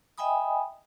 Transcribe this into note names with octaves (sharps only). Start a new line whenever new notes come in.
D#5 E5 G5 G#5 B5 D#6